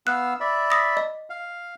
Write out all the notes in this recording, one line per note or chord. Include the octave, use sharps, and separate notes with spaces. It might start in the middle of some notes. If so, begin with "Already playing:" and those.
B3 F5 E6 F#6
D5 E5 B5
D#6 A#6
D#5
F5